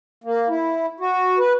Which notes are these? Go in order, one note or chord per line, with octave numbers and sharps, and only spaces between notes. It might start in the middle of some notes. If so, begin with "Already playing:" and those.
A#3
E4
F#4
B4